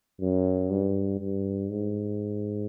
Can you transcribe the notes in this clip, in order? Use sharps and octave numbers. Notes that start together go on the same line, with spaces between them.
F#2
G2
G2
G#2